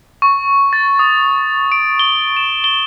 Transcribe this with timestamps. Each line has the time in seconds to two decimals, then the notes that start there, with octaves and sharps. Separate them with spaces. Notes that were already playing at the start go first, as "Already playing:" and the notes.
0.22 C#6
0.73 A6
0.99 D#6
1.72 D7
1.99 G7
2.37 E7
2.64 G7